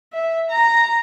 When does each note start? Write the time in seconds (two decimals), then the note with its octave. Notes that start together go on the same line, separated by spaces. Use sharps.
0.13 E5
0.50 A#5